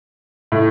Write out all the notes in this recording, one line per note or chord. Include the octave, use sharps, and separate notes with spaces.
A2